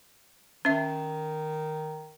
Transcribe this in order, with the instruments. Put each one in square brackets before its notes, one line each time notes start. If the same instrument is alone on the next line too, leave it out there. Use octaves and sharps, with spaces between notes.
[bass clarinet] D#3 [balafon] C#4 E5